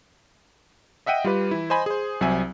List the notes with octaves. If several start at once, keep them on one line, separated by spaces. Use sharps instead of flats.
D#5 E5 F#5 G5 D#7
G3 F4 G4 B4
E3 E4
C5 D#5 G#5 B5
G#4 C5
C2 F#3 C4 E5 G#5